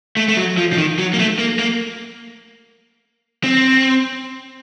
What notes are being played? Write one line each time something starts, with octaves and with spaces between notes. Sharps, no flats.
A3
A3
F#3
F3
F3
D#3
F#3
A#3
A3
A#3
A#3
C4